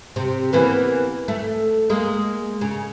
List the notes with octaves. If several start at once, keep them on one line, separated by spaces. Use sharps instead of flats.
C3
E3 A#3 B3
A3
G#3 A#3
C#3